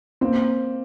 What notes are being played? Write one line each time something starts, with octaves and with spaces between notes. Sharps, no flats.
A#3 C4